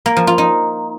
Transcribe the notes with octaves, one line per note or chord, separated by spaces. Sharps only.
A#3
F3
F4
D#4